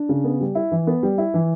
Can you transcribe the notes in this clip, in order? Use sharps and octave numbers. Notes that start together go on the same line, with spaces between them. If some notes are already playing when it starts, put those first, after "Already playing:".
Already playing: D4
C#3
B3
G3
E4
E3
B3
G3
E4
E3